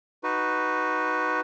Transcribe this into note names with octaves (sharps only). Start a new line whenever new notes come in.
D#4 F#4 B4